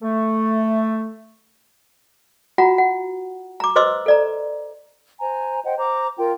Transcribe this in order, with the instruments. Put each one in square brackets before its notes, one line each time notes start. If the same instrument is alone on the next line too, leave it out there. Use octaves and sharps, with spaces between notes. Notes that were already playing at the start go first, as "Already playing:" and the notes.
[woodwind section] A3
[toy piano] F4 F#4 F#5 A#5
F#5
A#5 D6
B4 C5 D#5 C6 D6 E6
A4 D5 A#5
[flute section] C5 G#5 A#5
C5 D#5 F#5 G5
C5 A#5 D6
F4 A#4 G5